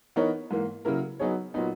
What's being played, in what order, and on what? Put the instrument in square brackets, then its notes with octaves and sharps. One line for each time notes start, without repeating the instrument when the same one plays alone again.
[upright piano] E3 B3 D#4 A#4 C#5
G#2 E3 A#3
C#3 F#3 A#3 E4 A#4
F#3 B3 D#4 G#4 C#5
A#2 F#3 B3 D#4